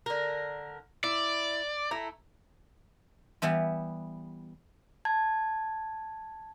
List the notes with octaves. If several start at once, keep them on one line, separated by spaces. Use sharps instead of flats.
D3 A#4
E4 D5
A3 E4 A#5
E3 G3 B3 E4
A5 G#6